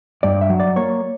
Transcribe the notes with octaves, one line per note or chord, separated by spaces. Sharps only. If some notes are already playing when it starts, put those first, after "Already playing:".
G2 D5
E5
F#3
D5
A#3 C#5